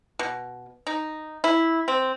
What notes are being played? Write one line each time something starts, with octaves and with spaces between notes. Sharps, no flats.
B2
D#4
E4
C4